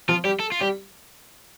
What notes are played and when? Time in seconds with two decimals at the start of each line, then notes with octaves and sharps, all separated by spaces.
0.09 F3 F4
0.24 G3 G4
0.40 A4
0.52 F4
0.61 G3 G4